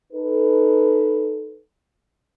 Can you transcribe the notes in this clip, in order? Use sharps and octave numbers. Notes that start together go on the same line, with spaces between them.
D#4 A4 B4